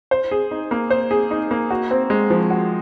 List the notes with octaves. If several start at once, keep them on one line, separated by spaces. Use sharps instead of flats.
C5
G#4
D#4
A#3
C5
G#4
D#4
A#3
F#4
C4
G#3
F3
F#4